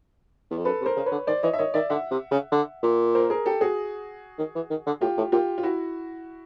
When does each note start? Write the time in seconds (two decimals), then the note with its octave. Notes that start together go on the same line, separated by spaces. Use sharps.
0.50 E2
0.58 F2
0.65 F#2 A4 B4
0.81 C3
0.86 A#4 C5
0.96 C#3
1.06 B4 C#5
1.12 D3
1.27 D#3 C5 D5
1.43 E3 C#5 D#5
1.53 E5
1.58 D#3 C#5 D#5
1.74 D#3 D5 E5
1.90 D3 E5 F#5
2.11 C3
2.31 C#3
2.52 D3
2.83 A#2
3.15 A#4 C5
3.30 G#4 A#4
3.46 G4 A4
3.61 F#4 G#4
4.39 D#3
4.55 E3
4.70 D#3
4.86 D3
5.01 A2 F4 G4
5.17 A2
5.32 A#2 F4 G4
5.58 F4
5.63 E4 F#4